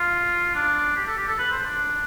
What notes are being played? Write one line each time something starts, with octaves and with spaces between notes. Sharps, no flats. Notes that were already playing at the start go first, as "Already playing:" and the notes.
Already playing: F4
D4
G4
A4
G4
A4
B4
C5
D4